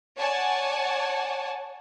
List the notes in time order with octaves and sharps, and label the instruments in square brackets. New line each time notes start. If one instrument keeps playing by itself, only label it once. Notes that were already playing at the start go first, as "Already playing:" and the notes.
[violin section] C#5 D5 F#5 G#5 A5